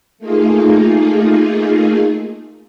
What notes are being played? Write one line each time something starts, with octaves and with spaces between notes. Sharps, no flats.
A3 A#3 D#4 F4 G#4